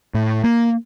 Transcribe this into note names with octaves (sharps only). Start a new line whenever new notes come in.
A2
A#3